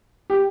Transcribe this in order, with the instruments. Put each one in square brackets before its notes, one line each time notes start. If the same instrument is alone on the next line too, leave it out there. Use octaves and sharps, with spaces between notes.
[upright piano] G4